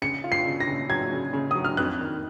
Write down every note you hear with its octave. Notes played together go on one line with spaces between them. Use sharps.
C#3 C#7
F4
C7
C#3
A#6
C#3
F#3 G#6
C#3
C#3
F#3 D#6
F6
F2 F#6
D#3